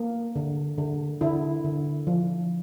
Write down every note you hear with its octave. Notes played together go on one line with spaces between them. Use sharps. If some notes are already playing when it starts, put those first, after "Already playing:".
Already playing: A#3
D3
D3
D3 E4
D3
F3